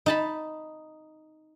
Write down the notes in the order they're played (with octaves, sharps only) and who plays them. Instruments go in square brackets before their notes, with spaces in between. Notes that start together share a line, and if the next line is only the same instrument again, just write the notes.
[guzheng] D#4 A5 B5